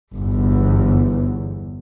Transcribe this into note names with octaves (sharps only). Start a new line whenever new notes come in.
G1 E2